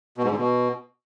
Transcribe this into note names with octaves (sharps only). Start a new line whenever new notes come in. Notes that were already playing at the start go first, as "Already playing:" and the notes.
B2
G#2
D3
B2